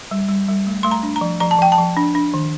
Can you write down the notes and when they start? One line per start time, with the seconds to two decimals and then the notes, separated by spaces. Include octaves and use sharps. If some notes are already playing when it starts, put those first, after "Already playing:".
0.11 G3
0.29 G3
0.48 G3
0.67 A3
0.83 A3 C6
0.91 A#5
1.03 D4
1.16 A#5
1.21 F3
1.40 F3 A#5
1.51 A5
1.58 F3 G5
1.72 A5
1.78 F3
1.97 D4
2.15 D4
2.34 D#3